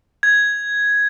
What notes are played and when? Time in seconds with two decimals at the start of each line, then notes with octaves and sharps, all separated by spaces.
0.23 G#6